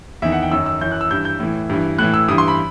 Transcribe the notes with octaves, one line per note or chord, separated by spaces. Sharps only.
E2 D#3 E5
F#5
G5
F#2 D#3 E6
E6
F#2 E3 G6
F#6
E6
G2 E3 G6
G6
A2 E3
G2 E3
A2 E3 F#6
E6
G2 E3 D#6
C6
B5